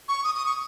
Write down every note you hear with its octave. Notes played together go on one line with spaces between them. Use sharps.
C#6
D#6
D#6
C#6